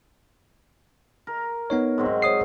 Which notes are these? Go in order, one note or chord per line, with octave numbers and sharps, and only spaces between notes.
A#4
B3 D#4 C#5
G#2 F#3 C4
C#5 D#6 C7